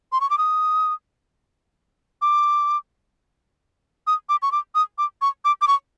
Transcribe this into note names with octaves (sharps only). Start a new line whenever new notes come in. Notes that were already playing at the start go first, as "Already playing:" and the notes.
C6
C#6
D6
D#6
D6
D#6
D6
C#6
D6
D#6
D6
C#6
D6
D6
C#6